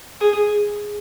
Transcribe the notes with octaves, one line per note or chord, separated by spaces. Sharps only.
G#4